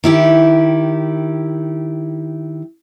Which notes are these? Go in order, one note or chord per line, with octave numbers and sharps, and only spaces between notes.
D#3 E4 G4